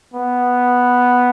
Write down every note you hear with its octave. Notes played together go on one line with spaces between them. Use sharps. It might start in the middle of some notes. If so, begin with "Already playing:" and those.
B3